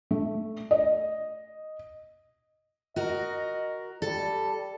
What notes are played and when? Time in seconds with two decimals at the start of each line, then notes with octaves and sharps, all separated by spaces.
0.11 A3
0.71 D#5
2.96 F#4 A#4 D#5
4.02 G3 A4